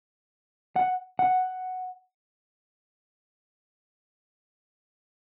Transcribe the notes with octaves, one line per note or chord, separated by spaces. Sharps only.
F#5
F#5